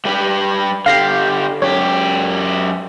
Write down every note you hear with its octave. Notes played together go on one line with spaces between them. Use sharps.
G3 G4 B4
D3 G4 F5 A#6 C7
F#2 G4 C#5